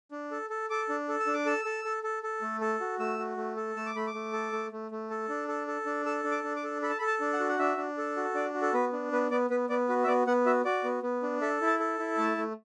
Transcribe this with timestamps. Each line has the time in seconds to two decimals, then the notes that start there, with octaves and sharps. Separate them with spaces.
0.12 D4
0.31 A4
0.50 A4
0.70 A4 D6
0.89 D4
1.08 A4
1.20 E6
1.27 D4
1.34 D6
1.46 A4 E6
1.65 A4
1.85 A4
2.03 A4
2.23 A4
2.42 A3
2.61 A4
2.80 F#4
3.00 A3 E6
3.19 F#4
3.37 A3
3.56 A4
3.76 A3 E6
3.86 D6
3.95 A3 B5
4.07 D6
4.14 A3
4.33 A4
4.52 A3
4.72 A3
4.91 A3
5.10 A4
5.29 D4
5.48 A4
5.67 A4
5.86 D4
6.06 A4 E6
6.24 D4
6.31 D6
6.44 D4
6.56 D6
6.64 A4
6.82 A4 B5
6.90 A5
6.99 A4 B5
7.07 A5
7.20 D4
7.33 F#5
7.40 F#4
7.49 F#5
7.59 D4 E5
7.77 D4
7.98 A4
8.17 F#4
8.35 D4 D5
8.54 F#4
8.62 A4
8.74 B3 B4
8.93 D4
9.12 B3 B4
9.31 B3 D5
9.50 B3 B4
9.69 B3 D5
9.88 F#4 B4
10.04 E5
10.07 B3 D5
10.27 B3 F#5
10.46 F#4 E5
10.65 F#4 D5
10.84 B3
11.03 B3
11.23 D4
11.41 A4 E5
11.61 E4
11.67 A5
11.80 A4
11.99 E4
12.18 A3 A5
12.37 A3